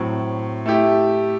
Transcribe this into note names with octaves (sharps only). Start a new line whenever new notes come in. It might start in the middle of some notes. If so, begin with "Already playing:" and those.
Already playing: A2 F#3 C4
A3 E4 G4